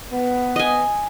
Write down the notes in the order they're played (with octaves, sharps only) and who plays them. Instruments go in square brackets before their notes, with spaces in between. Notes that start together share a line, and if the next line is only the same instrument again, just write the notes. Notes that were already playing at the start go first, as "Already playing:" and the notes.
[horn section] B3
[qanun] D#5 G#5